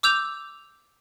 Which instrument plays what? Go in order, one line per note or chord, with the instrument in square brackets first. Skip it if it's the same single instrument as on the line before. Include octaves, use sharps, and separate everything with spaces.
[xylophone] D6 E6 G6 F7